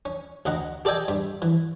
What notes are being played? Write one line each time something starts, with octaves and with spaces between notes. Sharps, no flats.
C#4
D2 D#5 F#5 A#5
G4 A4 D5 D#5 G5 G#5
G2
E3